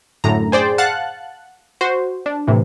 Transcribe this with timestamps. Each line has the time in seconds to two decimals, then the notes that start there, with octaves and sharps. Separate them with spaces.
0.24 F#2 A2 D3 A#5
0.52 G#4 C5 D5 G5
0.78 F5 F#5 A5 F#6 A6
1.81 F#4 C5
2.26 D4
2.47 A2 C3 E3